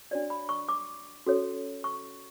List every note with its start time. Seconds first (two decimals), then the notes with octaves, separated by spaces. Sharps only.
0.11 D4 F#4 C#5 D5
0.30 B5
0.49 C#6
0.69 D6
1.27 C#4 F#4 A4 C#5
1.84 C#6